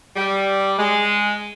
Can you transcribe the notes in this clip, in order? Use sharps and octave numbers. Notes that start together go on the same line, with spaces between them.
G3
G#3